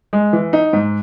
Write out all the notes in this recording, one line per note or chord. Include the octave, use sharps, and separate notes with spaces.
G#3
E3
D#4
G#2